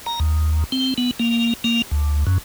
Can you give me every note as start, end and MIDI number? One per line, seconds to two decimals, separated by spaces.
0.06 0.20 82
0.20 0.64 39
0.72 0.94 60
0.98 1.11 59
1.20 1.54 58
1.64 1.82 58
1.91 2.24 38
2.27 2.38 42